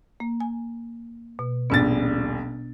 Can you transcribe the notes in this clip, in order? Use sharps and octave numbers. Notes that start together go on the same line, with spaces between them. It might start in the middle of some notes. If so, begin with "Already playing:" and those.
A#3
G#5
B2
D#1 A#1 B3 D4 A6